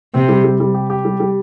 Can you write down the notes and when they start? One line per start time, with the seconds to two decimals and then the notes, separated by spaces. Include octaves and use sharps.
0.14 C3 C4
0.29 G3
0.44 G3
0.60 G3
0.74 G4
0.90 G4
1.05 G3
1.20 G3